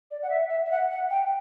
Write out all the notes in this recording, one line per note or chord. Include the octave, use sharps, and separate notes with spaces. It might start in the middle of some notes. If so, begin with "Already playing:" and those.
D5
F#5
E5
E5
E5
F#5
F#5
G5